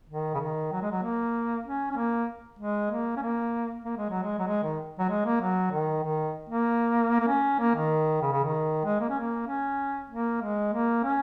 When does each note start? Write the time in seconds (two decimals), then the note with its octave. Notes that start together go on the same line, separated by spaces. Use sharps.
0.09 D#3
0.34 C#3
0.40 D#3
0.72 F#3
0.82 G#3
0.92 F#3
1.03 A#3
1.66 C#4
1.91 C#4
1.97 A#3
2.59 G#3
2.91 A#3
3.17 C#4
3.22 A#3
3.84 A#3
3.97 G#3
4.10 F#3
4.23 G#3
4.39 F#3
4.47 G#3
4.63 D#3
4.99 F#3
5.10 G#3
5.25 A#3
5.41 F#3
5.72 D#3
6.03 D#3
6.50 A#3
7.20 A#3
7.28 C#4
7.59 A#3
7.76 D#3
8.22 C#3
8.32 C#3
8.44 D#3
8.85 G#3
9.01 A#3
9.09 C#4
9.19 A#3
9.47 C#4
10.10 A#3
10.41 G#3
10.73 A#3
11.04 C#4